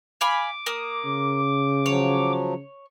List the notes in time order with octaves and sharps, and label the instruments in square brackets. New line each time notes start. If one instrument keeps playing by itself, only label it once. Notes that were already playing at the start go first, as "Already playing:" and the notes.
[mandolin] F5 G#5 B5 [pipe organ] D6
[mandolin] A#3 D#6
[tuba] C#3
[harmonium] F3 F#3 [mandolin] C#5